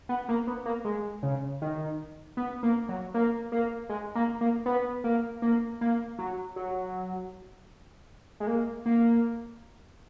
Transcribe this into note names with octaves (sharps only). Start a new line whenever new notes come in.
B3
A#3
B3
A#3
G#3
C#3
D#3
B3
A#3
F#3
A#3
A#3
G#3
A#3
A#3
B3
A#3
A#3
A#3
F#3
F#3
G#3
A#3
A#3